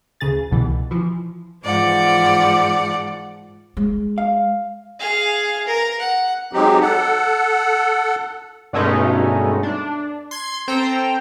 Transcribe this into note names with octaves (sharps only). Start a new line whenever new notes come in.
D2 C#3 G#4 A6
C2 B2 E3
E3 F3
G#2 E3 F3 D5 F#5
G#3
F5
G#4 F5
A#4
F#5
F#3 G#3 C4 D#4 G4
A4 F#5
G2 B2 G#3 A3 C#4 D#4
D4
C6 G#6
C4 A4 C5 G5 A#5